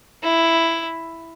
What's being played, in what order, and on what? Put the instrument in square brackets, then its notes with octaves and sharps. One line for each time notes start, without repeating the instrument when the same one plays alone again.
[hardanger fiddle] E4